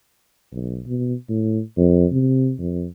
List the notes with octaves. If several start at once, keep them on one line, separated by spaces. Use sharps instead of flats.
B1
B2
A2
F2
C3
F2